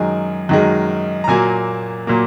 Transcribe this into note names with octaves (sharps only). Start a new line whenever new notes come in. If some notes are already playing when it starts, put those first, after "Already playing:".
Already playing: F#2 D#3 G#3 G#5
F#2 D#3 G#3
A#5
A#2 F#3 A#3 G#5
A#2 F#3 A#3